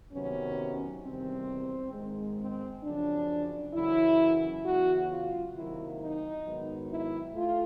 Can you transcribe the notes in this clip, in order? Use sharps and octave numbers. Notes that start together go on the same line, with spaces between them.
C3 D#3 F#3 B3 C#4
E2 C3 D#3 G3 C4
G#2 D#3 G#3
C4
F#2 C#3 F3 D4
F#2 C#3 E3 E4
E2 C#3 F#3 F#4
F4
C3 D#3 F#3 A#3 E4
D#4
G#2 D#3 F#3 B3
E4
A3 F4